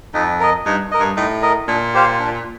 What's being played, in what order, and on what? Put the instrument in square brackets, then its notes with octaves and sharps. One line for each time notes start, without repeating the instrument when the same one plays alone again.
[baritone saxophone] F2 [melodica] D#4
[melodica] A#4 D#5
[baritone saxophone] G2 [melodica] D#4
[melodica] A#4 D#5
[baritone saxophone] G2
[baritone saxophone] A2 [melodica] D#4
[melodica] A#4 D#5
[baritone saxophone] A#2 [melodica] D4
[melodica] G4 C5 F5
D4